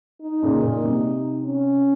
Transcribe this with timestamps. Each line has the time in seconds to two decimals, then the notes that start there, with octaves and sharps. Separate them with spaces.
0.22 D#4
0.42 A#2 C#3
0.63 A#2
0.84 C3
1.45 C#4